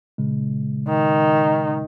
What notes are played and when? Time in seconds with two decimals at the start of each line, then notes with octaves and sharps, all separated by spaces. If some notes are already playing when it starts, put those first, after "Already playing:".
0.18 A#2 C#3 G#3
0.89 D#3